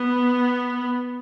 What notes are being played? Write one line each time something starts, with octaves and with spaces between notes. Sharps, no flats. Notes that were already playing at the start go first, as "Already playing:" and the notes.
Already playing: B3